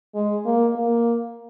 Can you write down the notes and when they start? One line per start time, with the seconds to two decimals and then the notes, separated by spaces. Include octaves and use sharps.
0.15 G#3
0.45 A#3
0.76 A#3